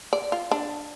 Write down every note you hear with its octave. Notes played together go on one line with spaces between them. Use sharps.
D5
F4
D4